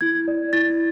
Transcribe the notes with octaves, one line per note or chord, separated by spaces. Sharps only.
E4 G#6
D5
E4 A6